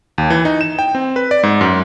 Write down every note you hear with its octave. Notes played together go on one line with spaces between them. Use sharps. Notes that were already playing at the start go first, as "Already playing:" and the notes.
D#2
E3
D#4
E7
G5
C4
B4
D5
G#2
F#2